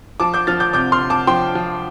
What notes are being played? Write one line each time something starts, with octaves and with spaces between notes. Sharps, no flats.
F3 A5 D6
D6 G6
F3 F6 A6
D6 G6
C3 D6 G6
C6 F6
C3
A5 D6
F3 G5 C6
F3